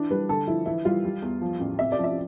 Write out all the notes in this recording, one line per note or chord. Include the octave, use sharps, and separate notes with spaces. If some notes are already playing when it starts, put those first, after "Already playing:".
Already playing: E3 D4
G3 B4
D3 A4
F3 E4
E3 E4
G3 F4
G3
E2
F3
A1
C3 E5
D5
F3
E5